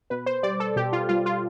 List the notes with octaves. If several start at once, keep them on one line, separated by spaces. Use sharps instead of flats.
B2 B4
C5
G3 D5
A4
B2 G4
F4
G3 F4
F4